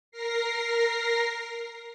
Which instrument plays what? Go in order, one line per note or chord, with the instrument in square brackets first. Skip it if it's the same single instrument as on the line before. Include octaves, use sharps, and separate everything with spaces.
[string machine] A#4 A#6 C7